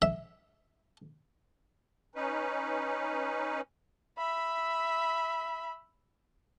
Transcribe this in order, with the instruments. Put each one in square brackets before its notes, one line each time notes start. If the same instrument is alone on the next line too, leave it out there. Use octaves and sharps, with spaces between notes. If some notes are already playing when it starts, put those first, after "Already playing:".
[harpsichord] E5
[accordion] C#4 D#4 B4
[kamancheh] E5 B5